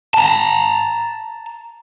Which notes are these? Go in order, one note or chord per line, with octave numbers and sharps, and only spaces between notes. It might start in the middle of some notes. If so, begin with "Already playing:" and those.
A5 A#5